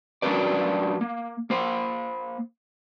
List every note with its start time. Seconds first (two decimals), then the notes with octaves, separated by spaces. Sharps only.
0.22 F#3 C#4 D4 A#4 B4 D5
1.01 A#3
1.50 A#3 C5